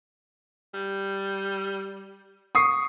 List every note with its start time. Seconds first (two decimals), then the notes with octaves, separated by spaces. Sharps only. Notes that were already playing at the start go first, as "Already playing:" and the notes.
0.74 G3
2.55 C#6 D#6 C7